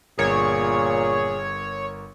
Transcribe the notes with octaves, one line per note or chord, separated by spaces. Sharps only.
G1 A#2 G#4 A#4 C#5